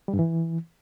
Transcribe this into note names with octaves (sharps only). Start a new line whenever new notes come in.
G3
G2
E3